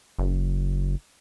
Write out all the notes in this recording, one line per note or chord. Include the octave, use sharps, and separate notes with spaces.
F#1